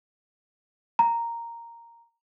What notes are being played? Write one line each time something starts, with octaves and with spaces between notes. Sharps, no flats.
A#5